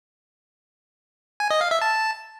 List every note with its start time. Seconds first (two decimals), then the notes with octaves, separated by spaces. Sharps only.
1.40 G#5
1.50 D#5
1.61 F5
1.71 E5
1.81 A5